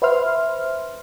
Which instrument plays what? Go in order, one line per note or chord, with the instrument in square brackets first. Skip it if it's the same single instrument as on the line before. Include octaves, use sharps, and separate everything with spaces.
[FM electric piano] B4 C5 E5 C6 F6